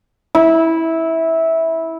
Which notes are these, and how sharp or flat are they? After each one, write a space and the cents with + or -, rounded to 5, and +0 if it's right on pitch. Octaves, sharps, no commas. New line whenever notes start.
E4 -15